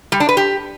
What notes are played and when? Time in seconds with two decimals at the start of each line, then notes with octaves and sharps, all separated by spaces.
0.12 G3
0.20 D4
0.29 B4
0.37 G4